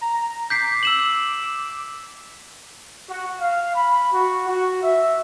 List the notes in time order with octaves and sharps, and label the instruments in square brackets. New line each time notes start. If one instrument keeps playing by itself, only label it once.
[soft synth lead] A#5
[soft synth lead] D6 [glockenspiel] G6 B6 C7
[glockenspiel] E6 E7 F#7
[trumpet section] F#4
F5
B5
F#4
F#4
E5